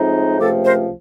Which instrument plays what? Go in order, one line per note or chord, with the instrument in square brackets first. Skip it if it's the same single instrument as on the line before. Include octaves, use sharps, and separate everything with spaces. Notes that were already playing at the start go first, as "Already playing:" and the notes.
Already playing: [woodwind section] A2 F3 G#3 C4 D#4
C#2 C3 F3 A3 G4 A4
A#4 C5